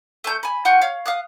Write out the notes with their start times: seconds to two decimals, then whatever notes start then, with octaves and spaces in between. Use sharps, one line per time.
0.24 A3 C5 A5 G6
0.43 G#5 B5
0.65 F4 F#5 G5 C#6
0.81 C#5 F5
1.06 F5 D#6 F#6